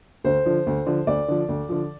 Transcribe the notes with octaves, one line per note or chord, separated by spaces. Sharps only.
D2 C5
D3 F3
D2
D3 F3
D2 D5
D3 F3
D2
D3 F3